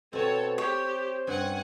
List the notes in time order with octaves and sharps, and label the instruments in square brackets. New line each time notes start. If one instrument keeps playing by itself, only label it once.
[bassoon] B2 [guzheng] C4 G#5 [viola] A4 C#5
[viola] G4 [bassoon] C5 [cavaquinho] C#5
[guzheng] G2 C4 C#4 [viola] F#5 G#5